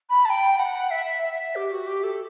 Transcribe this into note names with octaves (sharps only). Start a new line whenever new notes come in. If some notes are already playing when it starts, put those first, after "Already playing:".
B5
A5
G5
F#5
E5
E5
G4
F#4
G4
A4